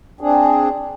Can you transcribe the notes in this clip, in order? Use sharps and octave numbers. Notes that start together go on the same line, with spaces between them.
C4 D4 G#4